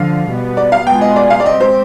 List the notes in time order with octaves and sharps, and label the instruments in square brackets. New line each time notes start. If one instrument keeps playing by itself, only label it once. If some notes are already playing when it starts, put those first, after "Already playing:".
Already playing: [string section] D3 F3 [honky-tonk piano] F5
[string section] B2 G3 B3
[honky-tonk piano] D5
F5
[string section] B2 G#3 B3 F4 G#4 [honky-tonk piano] G5
[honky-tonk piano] D#5
D5
F5
D5
[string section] G#3 C4 G4 [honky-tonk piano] D#5
[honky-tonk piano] C5